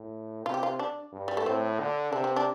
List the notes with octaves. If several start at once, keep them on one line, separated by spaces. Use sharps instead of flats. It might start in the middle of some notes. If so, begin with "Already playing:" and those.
Already playing: A2
C3 F4
G4
F4
D4
G2
G3
A3
A2 C4
D3
C3 D4
C4
D4